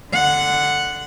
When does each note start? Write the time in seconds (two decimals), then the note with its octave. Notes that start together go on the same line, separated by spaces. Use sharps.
0.12 D3 F#5